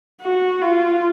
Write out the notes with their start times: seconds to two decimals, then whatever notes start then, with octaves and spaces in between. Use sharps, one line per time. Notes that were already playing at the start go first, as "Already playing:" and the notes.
0.22 F#4
0.61 F4